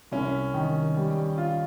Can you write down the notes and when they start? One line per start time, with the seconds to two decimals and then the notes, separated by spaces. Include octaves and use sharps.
0.12 C2 C#4
0.54 D#3
0.96 G3
1.38 F4